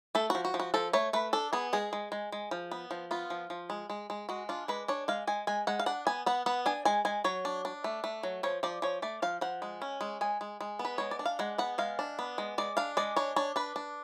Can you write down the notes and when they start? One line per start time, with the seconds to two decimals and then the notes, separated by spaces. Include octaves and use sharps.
0.15 A3 A4
0.30 F3 F#4
0.45 F#4
0.54 F3
0.60 F#4
0.74 F3 A4
0.93 A3 C#5
1.13 A3 B4
1.33 D4 A4
1.53 B3 G#4
1.73 G#3 G#4
1.93 G#3
2.12 G#3
2.32 G#3
2.51 F3
2.71 B3
2.91 F3
3.11 B3 F4
3.30 F3
3.50 F3
3.70 G#3
3.90 G#3
4.10 G#3
4.29 G#3 F#4
4.49 D4 F4
4.68 G#3 B4
4.88 D4 C#5
5.08 G#3 F5
5.27 G#3 G#5
5.47 G#3 G#5
5.67 G#3 F#5
5.79 F5
5.86 D4 F#5
6.07 B3 G#5
6.26 B3 F#5
6.46 B3 F#5
6.66 D4 G#5
6.85 G#3 G#5
7.05 G#3 G#5
7.24 F#3 C#5
7.45 D4
7.65 D4
7.84 A3
8.04 A3
8.23 F#3
8.43 F3 C#5
8.63 F3 D5
8.82 F3 C#5
9.02 A3 D5
9.22 F3 F5
9.41 F3 F#5
9.62 G#3
9.82 C#4
10.01 G#3
10.21 G#3 G#5
10.41 G#3
10.61 G#3
10.79 B3
10.85 B4
10.98 G#3 C#5
11.11 D5
11.19 D4
11.26 F5
11.39 G#3 F#5
11.58 B3 F#5
11.78 G#3 F5
11.99 D4
12.19 B3
12.38 G#3
12.58 G#3 D5
12.77 D4 F5
12.97 G#3 D5
13.16 D4 C#5
13.36 D4 C#5
13.56 D4 B4
13.76 D4